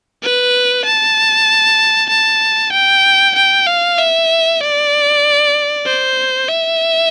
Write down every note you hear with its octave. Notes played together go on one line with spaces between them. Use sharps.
B4
A5
A5
G5
G5
F5
E5
D5
C5
E5